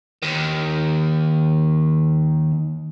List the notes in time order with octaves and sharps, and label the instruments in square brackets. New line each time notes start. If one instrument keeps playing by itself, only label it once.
[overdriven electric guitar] D#2 D#3